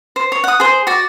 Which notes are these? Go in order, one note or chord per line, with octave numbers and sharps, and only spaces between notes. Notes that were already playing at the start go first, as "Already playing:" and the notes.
C5
C#5
F#5 D#6
G#4 C5
F#4 D5